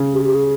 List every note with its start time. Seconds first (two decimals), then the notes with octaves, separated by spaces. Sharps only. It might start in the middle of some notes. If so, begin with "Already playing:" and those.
Already playing: C#3
0.14 G4
0.24 G4
0.35 G#4